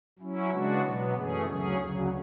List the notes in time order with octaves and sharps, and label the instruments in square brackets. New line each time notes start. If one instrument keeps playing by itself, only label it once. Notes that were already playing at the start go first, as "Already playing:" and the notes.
[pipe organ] F#3 C#4 E4
C#3 G#3 B3 D4 F#4
B2 F#3 B3
F#2 E3 A3 C#4 G#4
D2 C#3 F#3 C#4 G#4
D2 C#3 F#3